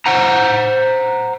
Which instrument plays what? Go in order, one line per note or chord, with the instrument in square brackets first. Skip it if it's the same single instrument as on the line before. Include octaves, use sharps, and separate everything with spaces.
[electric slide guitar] C5 F#5 A#5